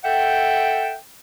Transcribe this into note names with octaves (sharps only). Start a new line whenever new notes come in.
A4 E5 F#5 G5